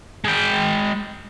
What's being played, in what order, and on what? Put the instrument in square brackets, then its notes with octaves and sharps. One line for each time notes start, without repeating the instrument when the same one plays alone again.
[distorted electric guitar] G#3 G5